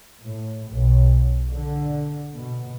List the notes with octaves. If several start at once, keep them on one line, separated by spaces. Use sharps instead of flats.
A2
B1
D3
B2